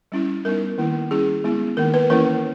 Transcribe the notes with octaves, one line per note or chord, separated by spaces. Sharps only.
G3 C#4 E4
G3 B3 D#4 A#4
D#3 A#3 E4
G3 C#4 E4 G#4
G#3 B3 E4
D#3 A#3 D#4 A#4
B4
E3 A#3 C#4 E4 A#4